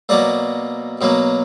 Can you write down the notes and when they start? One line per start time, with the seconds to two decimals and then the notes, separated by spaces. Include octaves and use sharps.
0.09 B2 F#3 A#3 D5
1.01 B2 F#3 A#3